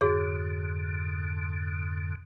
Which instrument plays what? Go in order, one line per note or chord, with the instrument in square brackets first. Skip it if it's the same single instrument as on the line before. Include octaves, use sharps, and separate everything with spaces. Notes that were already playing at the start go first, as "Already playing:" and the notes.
[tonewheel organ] F2 G#2 D3 [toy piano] F#4 G#4 C#5